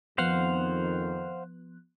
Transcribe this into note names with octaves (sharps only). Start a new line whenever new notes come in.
F2 D#3 F3 B3 C5 F5 F#5 F#6